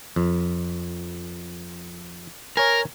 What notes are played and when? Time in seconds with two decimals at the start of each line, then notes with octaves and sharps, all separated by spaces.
0.16 F2
2.57 A#4 C#5 G#5